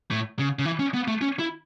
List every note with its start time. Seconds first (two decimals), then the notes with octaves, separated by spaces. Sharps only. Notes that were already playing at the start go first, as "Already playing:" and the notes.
0.11 A2
0.39 C#3
0.59 C#3
0.65 E3
0.80 C#4
0.94 B3
1.08 A3
1.21 C#4
1.39 E4